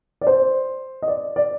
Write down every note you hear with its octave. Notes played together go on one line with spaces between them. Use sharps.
D5
C5
D#5
D5
D5